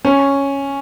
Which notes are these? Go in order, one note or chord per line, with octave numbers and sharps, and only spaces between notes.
C#4